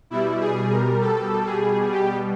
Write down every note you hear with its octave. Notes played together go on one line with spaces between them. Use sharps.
B2 G3 E4
G#4
A#4
A4
G#4
G4